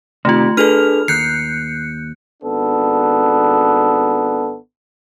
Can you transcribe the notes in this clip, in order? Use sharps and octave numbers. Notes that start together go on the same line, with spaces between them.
C3 D#3 A3 F4 G4
D4 G#4 A4 B4 F6 F7
D#2 F#6 G6 C7 C#7
G#1 B3 D4 A4